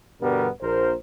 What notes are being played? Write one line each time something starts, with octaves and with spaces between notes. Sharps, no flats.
G2 B2 D3 G3 B3 A#4
A#1 A#4 C5